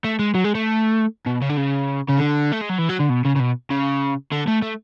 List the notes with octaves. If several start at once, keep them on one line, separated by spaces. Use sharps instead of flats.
A3
G#3
F#3
G#3
A3
B2
C#3
D3
C#3
C#3
D3
A3
G#3
F#3
E3
F#3
D3
B2
C#3
C#3
B2
C#3
D3
A3
A3